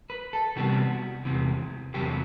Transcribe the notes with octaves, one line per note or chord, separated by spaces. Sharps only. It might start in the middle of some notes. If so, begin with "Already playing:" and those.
B4
A4
C2 C3 E3 G3 B3 F#4
E2 C3 E3
E2 C3 F#3 A3 G4